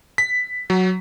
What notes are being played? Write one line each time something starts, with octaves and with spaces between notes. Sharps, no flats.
B6
F#3